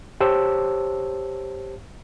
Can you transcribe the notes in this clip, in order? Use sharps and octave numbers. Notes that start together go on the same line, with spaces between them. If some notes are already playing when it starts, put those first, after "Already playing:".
G4 C5 C#5 A5 E6